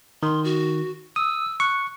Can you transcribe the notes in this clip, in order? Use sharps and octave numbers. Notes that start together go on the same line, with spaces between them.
D#3 C6
F#4
D#6 E6
C#6 F#6